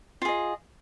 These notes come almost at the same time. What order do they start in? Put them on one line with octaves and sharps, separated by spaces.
F4 G#4 D#5